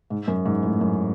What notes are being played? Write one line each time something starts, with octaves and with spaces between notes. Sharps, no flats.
G#2
F#2
G#2
A2
F#2